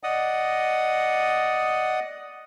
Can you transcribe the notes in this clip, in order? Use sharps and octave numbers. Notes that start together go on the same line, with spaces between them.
D5 D#5 F#5 D#6